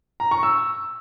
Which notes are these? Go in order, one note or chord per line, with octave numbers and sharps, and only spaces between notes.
A#5
C#6
E6